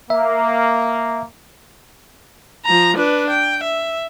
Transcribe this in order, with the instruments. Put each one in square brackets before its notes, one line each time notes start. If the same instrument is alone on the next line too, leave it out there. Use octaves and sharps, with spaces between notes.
[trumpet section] A#3 [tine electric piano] E5
[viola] F3 A#5
D4 B4
G5
E5